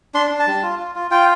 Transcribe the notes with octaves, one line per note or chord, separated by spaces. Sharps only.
D4 C6
D4
A5
G3
F4
F4
F4
F4 G5